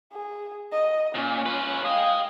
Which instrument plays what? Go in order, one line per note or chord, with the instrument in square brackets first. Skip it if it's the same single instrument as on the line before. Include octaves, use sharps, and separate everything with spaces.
[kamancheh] G#4
D#5
[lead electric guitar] A#2 [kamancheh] C#4
[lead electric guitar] F4 B4
[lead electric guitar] G#4 D#5 [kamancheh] F5 G5